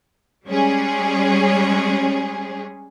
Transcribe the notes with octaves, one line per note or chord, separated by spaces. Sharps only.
G3 G#3 C#4 G#4